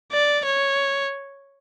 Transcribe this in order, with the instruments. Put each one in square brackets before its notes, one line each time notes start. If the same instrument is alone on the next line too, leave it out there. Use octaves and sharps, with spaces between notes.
[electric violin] D5
C#5